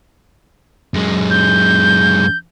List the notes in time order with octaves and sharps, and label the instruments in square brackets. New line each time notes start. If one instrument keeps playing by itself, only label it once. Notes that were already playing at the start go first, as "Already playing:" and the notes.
[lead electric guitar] F#2 G#3
[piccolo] G6